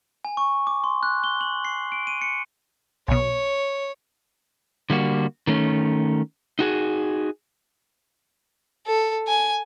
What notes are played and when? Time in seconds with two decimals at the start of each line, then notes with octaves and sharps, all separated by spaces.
0.25 G#5
0.37 C#6
0.67 D6
0.84 C6
1.03 F#6
1.24 G7
1.41 F#7
1.65 C7
1.92 D7
2.07 D#7
2.22 C#7
3.08 B1 B2 C#5
4.90 D3 G3 A#3 F#4
5.47 D#3 A3 C#4
6.59 D#4 F#4 G#4
8.87 A4
9.28 G#5